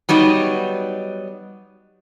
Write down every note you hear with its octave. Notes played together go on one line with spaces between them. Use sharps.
F#3 G3 B3 D#4